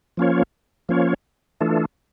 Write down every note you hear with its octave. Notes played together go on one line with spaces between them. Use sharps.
F3 A#3 C#4 F4 C#5
F3 A#3 C#4 F4 C#5
E3 A3 D4 F4 A4